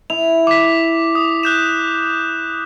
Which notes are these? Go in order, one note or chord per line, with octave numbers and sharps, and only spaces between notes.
E4 F7
D6 B6
D#6
F#6 G6 E7